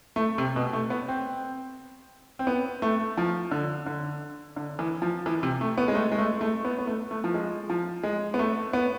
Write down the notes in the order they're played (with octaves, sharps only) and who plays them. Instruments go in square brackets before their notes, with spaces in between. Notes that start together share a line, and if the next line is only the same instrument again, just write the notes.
[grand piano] A3
C3
B2
A3
B3
C4
C4
B3
A3
F3
D3
D3
D3
E3
F3
E3
C3
A3
B3
G#3
A3
G#3
A3
A3
B3
B3
A3
A3
F3
G#3
F3
G#3
B3
A3
B3